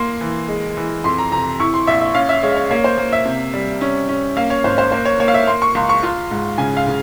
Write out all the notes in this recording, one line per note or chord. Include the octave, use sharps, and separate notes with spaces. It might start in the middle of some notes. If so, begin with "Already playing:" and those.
Already playing: A#3 C6
E3
G#3
E3
F2 C6
A#5
C3 A#5
E4 C#6
C6
A#1 E5
E5
C#4 F5
E5
G#3 C#5
C#5
A#3 C#5
C5
A#3
E5
C3
G3
C#4
C#4
A#3 F5
C#5
G#1 C5
C5
A#3 C5
C#5
A#3 C#5
F5
E5
A#3 C6
C#6
C#2 C6
C#6
F4 C6
G#2
C#3 G#5
F5
C#3